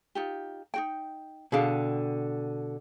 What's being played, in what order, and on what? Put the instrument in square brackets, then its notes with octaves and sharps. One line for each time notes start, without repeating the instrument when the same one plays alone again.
[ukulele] D#4 F4 G4
D#4 F#4 G5
[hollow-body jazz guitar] B2 D3 [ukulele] G#4 F5 G5